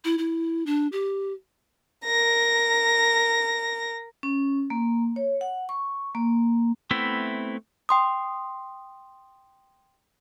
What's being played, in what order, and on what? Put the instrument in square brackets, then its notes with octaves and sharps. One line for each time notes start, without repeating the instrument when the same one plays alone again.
[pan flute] E4
E4
D4
G4
[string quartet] A#4 A#6
[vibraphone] C#4
A#3
C#5
F#5
C#6
A#3
[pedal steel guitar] A3 B3 C4 E4 E5
[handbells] G5 C6 D#6